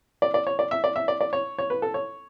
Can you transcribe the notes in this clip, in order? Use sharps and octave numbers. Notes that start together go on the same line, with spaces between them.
D5
D5
C#5
D5
E5
D5
E5
D5
D5
C#5
C#5
B4
A4
C#5